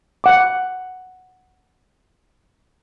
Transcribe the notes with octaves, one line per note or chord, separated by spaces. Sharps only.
F#5 D6